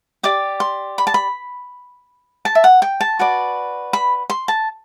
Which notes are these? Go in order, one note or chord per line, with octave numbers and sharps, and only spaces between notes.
G4 D5 D6
C6
B5
A5
B5
A5
E5
F#5
G5
A5
F#4 B4 D5
B5
C6
A5